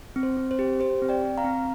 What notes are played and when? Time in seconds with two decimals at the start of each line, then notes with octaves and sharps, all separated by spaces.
0.16 C4
0.23 C5
0.37 C4
0.51 C5
0.59 G4
0.80 G4 C5
1.02 C4
1.09 D5 G5
1.24 C4
1.38 F5 A#5
1.44 C4